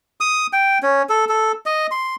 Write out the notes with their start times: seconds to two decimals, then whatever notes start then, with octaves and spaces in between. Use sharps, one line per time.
0.20 D#6
0.53 G5
0.83 C#4
1.09 A4
1.29 A4
1.66 D#5
1.91 C6